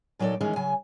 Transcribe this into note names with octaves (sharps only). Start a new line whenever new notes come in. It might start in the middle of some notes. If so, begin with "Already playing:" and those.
A#2 F#3 D#4 G4 A4 D5
D#3 E3 G#3 C#4 D#4
C#3 F#3 G#5